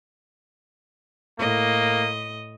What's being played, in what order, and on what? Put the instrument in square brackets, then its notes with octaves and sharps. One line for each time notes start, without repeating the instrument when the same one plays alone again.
[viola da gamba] A2 D#5 [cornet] A#3